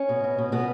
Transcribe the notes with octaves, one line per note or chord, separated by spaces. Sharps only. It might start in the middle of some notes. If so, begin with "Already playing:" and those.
Already playing: C#4
B2
B2
B2
B2 B3